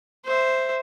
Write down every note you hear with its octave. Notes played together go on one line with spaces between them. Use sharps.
C5 E5